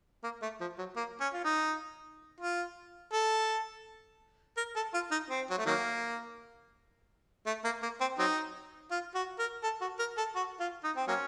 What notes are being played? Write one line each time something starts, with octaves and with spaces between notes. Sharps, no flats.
A#3
A3
F3
F#3
A#3
C#4
F4
D#4
F4
A4
A#4
A4
F4
D#4
C4
F#3
A3
D#3 F#3 A#3
A3
A#3
A#3
C4
F#3 C4 D#4
F4
F#4
A#4
A4
F#4
A#4
A4
F#4
F4
D#4
C4
F#3 A#3 C#4